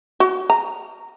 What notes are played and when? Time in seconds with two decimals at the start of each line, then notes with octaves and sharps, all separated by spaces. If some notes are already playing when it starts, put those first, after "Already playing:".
0.20 F#4
0.50 A#5